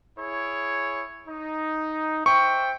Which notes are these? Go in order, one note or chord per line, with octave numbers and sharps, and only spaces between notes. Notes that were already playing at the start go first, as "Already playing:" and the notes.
E4 G#4 C#5
D#4
C5 E5 G5 C#6